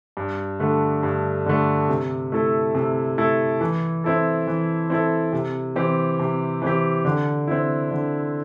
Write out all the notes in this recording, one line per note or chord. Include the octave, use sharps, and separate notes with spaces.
G2
D3 A3
G2
D3 A3
C3
A3 E4 A4
C3
A3 E4 A4
E3
C4 E4 A4
E3
C4 E4 A4
C3
E3 C4 G4
C3
E3 C4 G4
D3
C4 E4
D3